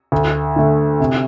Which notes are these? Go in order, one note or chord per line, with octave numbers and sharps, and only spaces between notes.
D2
D3 A3
C3